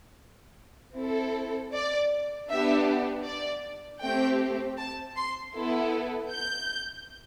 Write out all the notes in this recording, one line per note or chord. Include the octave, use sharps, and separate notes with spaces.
C4 E4 A4
D5
B3 D4 G4 E5
D5
A3 C4 G4 G5
A5
C6
B3 E4 A4
G6